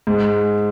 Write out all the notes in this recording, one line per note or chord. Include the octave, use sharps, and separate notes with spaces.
G#2